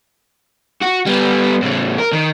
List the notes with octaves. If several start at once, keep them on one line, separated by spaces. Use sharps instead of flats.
F#4
G3 B3
A2 C#3
A#4
D#3